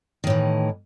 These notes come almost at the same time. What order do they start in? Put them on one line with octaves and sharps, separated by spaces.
D#3 A2 E3